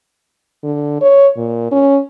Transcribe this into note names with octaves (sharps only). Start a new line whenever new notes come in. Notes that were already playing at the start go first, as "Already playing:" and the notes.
D3
C#5
A#2
C#4